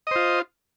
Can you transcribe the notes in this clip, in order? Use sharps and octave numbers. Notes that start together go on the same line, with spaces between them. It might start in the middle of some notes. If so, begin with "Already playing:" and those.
F4 C5 D#5